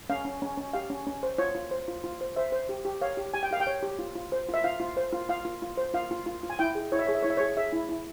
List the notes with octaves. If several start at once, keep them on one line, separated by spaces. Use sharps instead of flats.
C#4 F5
C#4
C#4
C#4
G4 F5
C#4
C#4
C5
F4 C#5
F4
C5
F4
F4
C5
C5 E5
C5
G4
G4
C#5 F5
G4
G4 G#5
G5
G4 F5
G5
C#5
G4
F4
F4
C5
F4
E5
F4 F5
F4
C5
F4
F4 F5
F4
F4
C5
F4 F5
F4
F4
F4
G#5
E4 G5
G#4
E4 C#5
E5
G#4 C#5
E5
E4 C#5
E5
G#4 C#5
G#4 E5
E4
E4